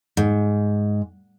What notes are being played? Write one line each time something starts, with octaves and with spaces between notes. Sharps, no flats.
G#2